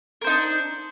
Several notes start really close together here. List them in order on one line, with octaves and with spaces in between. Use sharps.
A#4 C5 D#4 D4